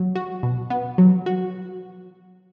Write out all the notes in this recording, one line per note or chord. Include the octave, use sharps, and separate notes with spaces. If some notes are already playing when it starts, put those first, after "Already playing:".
Already playing: F#3
F#4
B2
B3
F#3
F#4